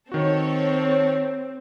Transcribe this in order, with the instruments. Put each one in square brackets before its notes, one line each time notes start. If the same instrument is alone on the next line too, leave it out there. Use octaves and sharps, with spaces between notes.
[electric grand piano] D#3 F#4 [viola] C4 [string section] A4 C#5